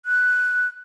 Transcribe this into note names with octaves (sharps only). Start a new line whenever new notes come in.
F#6